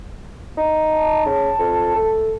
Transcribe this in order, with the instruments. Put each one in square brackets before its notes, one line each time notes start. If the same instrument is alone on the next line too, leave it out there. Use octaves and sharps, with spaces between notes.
[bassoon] D#4
[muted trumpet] A5
[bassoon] C#3
F2
A3